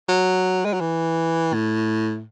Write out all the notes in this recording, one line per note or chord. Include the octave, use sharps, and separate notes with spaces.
F#3
G#3
F#3
E3
A2